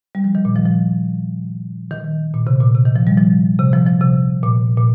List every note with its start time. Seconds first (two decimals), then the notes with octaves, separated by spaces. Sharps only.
0.15 G3
0.24 F3
0.35 D#3
0.45 A#2
0.55 F3
0.66 F3
1.91 D#3
2.34 A#2
2.47 C3
2.60 A#2
2.75 C3
2.86 D#3
2.96 F3
3.07 G3
3.17 F3
3.59 C3
3.73 F3
3.86 F3
4.01 C3
4.43 A#2
4.77 A#2